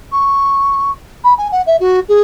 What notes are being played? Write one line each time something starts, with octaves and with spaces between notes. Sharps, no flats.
C#6
B5
G#5
F#5
E5
F#4
G#4